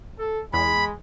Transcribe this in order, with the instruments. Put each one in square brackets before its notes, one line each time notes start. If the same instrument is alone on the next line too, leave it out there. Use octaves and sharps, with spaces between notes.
[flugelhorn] A4
[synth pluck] E2 [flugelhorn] G#3 [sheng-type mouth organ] B5